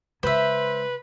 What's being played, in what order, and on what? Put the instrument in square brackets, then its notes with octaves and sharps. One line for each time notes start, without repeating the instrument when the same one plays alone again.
[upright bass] C#3 G#3 [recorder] B4 [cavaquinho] C5 E5